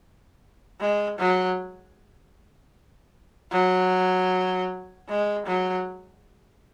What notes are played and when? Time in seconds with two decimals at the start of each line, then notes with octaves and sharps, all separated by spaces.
0.80 G#3
1.19 F#3
3.52 F#3
5.09 G#3
5.46 F#3